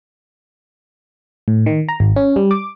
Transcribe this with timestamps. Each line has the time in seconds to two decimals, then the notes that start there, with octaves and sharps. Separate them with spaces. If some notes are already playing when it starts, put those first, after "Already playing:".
1.48 A2
1.66 D#3
1.89 A#5
2.00 G#1
2.16 C#4
2.36 G3
2.51 D6